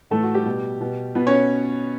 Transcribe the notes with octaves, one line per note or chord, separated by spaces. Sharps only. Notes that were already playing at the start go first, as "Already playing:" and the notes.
A2 E3 A3 A4
F#4
G3 G4
B2
B2
B2 B3 B4
C#4 C#5